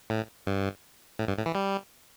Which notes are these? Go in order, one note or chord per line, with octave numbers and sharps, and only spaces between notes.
A2
G2
A2
G2
A2
E3
G3